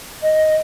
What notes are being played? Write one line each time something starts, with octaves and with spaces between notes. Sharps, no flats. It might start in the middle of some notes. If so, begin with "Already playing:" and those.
D#5